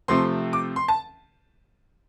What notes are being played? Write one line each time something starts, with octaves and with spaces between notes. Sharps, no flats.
C3 F3 A3 C4 C6
D6
C6
A5